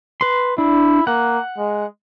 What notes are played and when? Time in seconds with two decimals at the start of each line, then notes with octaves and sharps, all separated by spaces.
0.21 B4 C6
0.58 D4 E4
1.07 A#3 F#5
1.58 G#3